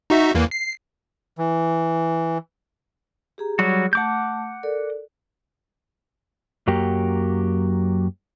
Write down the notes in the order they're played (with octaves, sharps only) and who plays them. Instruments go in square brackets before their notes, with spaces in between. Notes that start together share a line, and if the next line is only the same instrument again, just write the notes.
[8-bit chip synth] D#4 F#4 E5
E2 E3 A#3
C7
[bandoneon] E3
[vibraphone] G4 G#4 A#5
[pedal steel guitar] F#3 G3 F#4
[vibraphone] A3 A5 [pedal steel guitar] F#5 D6 G6
[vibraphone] A4 A#4 D5
[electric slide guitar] F#2 F#3 A#3 G4